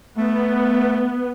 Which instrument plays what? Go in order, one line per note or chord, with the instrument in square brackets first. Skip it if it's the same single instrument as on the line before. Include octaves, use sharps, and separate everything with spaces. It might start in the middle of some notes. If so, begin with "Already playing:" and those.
[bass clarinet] A3 [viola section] B3